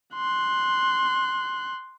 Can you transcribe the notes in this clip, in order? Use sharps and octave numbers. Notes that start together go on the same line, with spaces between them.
C6 F#6